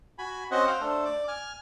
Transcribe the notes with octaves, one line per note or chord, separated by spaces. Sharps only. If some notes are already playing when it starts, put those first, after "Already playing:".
F#4 G#5 B5
C4 C#4 F#4 C5 D#5 F#5
C5 F5 G5
A3 D4 A4 C5
D5 D6
G#5 F6